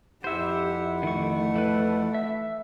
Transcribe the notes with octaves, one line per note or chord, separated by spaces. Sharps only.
F2 E4 G4 C5 E5 F#5
D#3 A3 C#6
E3 B4
E5